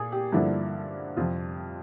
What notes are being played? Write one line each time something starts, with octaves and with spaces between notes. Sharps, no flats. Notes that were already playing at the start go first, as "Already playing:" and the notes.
Already playing: A#2 G#4
G4
G2 D3 F3 A#3 D4 E4
F2 C3 F3 F4